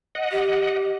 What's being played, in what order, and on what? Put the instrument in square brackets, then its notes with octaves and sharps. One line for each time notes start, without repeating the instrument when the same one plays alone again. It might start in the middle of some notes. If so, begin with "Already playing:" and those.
[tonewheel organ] D#5 F#5
[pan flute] G4